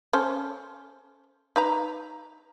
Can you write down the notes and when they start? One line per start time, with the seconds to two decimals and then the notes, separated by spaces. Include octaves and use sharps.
0.13 C#4 A4 C5
1.56 D#4 B4 A#5